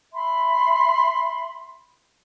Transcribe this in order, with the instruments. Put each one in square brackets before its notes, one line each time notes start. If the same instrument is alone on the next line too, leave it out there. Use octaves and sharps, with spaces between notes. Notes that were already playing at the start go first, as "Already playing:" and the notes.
[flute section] E5 B5 C6